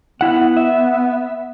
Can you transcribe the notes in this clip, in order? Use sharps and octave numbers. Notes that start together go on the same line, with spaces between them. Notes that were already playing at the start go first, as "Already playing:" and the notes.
B3 E4 F#5
E5